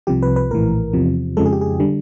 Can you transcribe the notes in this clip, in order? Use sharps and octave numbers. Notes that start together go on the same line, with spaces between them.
C2 C3 F3 G4
B4
B4
A#1 A2 E3 A#4
E2 C3 F3
F2 C#3 F3 G#3 A4
G#4
G4
G#4
D3 G3